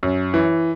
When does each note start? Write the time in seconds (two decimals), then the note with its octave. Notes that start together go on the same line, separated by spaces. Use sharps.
0.03 F#2
0.34 E3